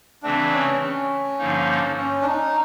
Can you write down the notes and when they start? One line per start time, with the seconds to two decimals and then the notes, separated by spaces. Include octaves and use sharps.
0.23 C#3 E3 A3 C4 D4
0.52 C#4
0.82 C#4
1.39 G2 D3 F3 A#3 D#4
1.97 C#4
2.22 D4
2.26 D#4